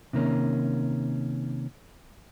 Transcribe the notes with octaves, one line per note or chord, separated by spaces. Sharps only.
C3 D#3 A#3 C#4